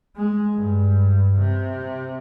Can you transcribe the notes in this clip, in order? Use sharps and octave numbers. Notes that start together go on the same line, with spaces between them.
G#3
G2
C3